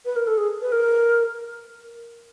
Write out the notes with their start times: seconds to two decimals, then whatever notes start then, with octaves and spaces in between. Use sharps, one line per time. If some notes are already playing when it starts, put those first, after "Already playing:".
0.05 B4
0.16 A#4
0.27 A4
0.38 G#4
0.62 B4
0.72 A#4